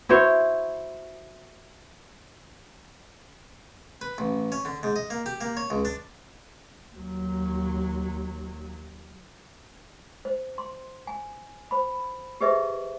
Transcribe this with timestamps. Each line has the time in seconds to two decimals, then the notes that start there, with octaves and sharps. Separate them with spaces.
0.09 E4 F#4 C5 C#5
4.01 B4
4.18 A1
4.52 C#4
4.65 D3
4.83 G#2
4.96 D#5
5.10 A#3
5.26 G4
5.41 A#3
5.57 C#5
5.70 C#2
5.85 D4
6.94 D#2 F#3
10.25 C5
10.58 C6
11.07 G#5
11.71 C5 B5
12.41 G4 G#4 B4 C5 D#5 E5